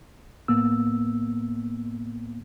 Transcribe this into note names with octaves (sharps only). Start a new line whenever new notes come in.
A2 A#3 B3 E6